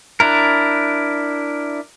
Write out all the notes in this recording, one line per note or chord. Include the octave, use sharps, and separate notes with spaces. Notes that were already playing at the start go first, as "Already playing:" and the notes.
D4 E4 A#4